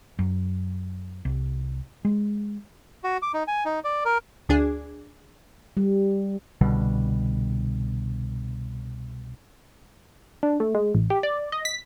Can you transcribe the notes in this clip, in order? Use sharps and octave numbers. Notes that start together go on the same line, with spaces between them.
F#2
C2
G#3
F#4
D6
D#4
G#5
D#4
D5
A#4
D2 D4 G#4
G3
C2 B2 D3 G3
D4
A3
G#3
A1
G4
D5
D#5
B6